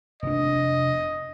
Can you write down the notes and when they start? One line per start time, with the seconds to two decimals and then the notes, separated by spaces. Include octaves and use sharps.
0.23 F1 D4 D#5